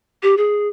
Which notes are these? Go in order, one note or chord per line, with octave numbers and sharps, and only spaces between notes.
G4
G#4